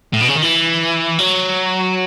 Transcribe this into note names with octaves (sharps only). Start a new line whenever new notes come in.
A2
B2
C#3
D#3
E3
F#3